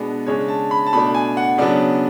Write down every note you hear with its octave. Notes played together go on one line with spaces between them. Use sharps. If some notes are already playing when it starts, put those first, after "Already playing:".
Already playing: B2 G#3 B3 D4
C#3 G#3 D4 C#5
A5
B5
A5
B2 A3 D4 B5
G#5
F#5
C#3 F#3 B3 D4 D5